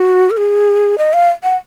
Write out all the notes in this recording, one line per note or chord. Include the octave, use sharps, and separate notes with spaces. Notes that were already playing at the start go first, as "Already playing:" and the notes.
Already playing: F#4
A#4
G#4
D#5
F5
F#5